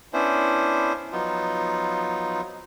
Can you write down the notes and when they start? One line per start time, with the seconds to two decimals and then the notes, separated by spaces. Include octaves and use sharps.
0.13 B3 C#4 D4 E4 C5
1.12 F3 F#3 B3 D#4 F4